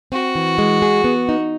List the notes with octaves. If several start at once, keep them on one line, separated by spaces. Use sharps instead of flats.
C4 F#4
E3
G#3
G#4
B3
D#4